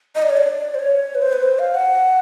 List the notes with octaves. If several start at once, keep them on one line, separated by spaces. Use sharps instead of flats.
D#5
D5
C#5
D5
C5
C#5
B4
C5
B4
C5
F5
F#5